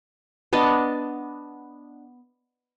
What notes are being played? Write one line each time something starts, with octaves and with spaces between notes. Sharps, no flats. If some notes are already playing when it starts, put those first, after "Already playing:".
B3 D4 D#5 A5